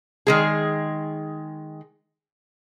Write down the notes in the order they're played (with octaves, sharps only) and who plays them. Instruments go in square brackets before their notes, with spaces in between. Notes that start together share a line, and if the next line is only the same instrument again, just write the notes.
[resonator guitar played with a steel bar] D#3 G#3 G#4